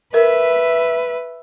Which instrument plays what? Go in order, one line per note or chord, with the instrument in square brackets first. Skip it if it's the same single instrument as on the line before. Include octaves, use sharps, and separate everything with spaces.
[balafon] A#4 [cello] B4 [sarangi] E5